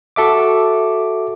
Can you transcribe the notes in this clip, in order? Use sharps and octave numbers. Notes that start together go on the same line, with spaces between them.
F#4 A4 E5 D6